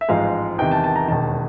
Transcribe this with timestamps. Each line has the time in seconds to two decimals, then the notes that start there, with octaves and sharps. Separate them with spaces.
0.01 E5
0.08 A1 G#2 F3 G#3 F5
0.58 E2 C3 D#3 G5
0.71 A5
0.84 A5
0.96 A#5
1.08 E1 D#2 D#3 A5